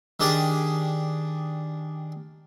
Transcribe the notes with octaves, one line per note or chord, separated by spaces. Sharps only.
D#3 D4 G4 G#4 D5